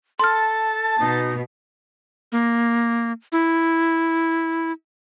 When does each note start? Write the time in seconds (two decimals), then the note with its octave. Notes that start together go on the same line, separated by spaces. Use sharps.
0.20 A4 A5 C6 F6
1.00 B2 D#4
2.32 A#3
3.32 E4